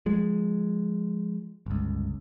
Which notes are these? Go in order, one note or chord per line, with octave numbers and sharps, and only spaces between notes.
F3 G#3
G1 C#2